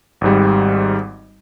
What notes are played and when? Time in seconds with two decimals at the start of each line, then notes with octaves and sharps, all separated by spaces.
0.21 G#1 G#2 G3